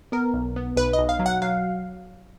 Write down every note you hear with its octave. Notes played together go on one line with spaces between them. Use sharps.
B3 A#4
B1
B3
B1 B4
D#5
B1
F5
F#3
F#5
F#3 F5